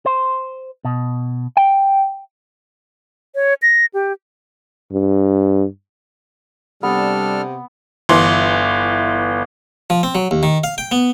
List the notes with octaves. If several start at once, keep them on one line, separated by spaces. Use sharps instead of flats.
C5
B2
G5
C#5
A#6
G4
G2
C3 G3 B3 D4 A4 F6
G1 E3 C6
F3
C4
F#3
D#2
D#3
F5
G5
B3